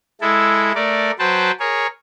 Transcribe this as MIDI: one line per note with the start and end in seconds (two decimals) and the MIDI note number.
0.21 0.72 56
0.21 0.72 64
0.21 0.72 69
0.75 1.11 57
0.75 1.11 70
0.75 1.11 74
1.19 1.51 54
1.19 1.51 71
1.19 1.51 72
1.19 1.51 79
1.19 1.51 81
1.60 1.87 68
1.60 1.87 70
1.60 1.87 73